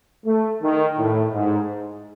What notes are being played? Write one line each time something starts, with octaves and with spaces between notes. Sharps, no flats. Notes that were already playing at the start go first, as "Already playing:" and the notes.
A3
D#3
A2
G#2